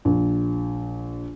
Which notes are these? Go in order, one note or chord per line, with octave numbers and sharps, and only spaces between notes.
A#1